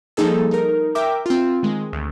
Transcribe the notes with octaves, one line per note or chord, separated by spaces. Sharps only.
F3 G3 A#3 D#4 G#4 A4
D#4 A#4
A#4 E5 G5 D6
C4 F4
D#3 G#3
D2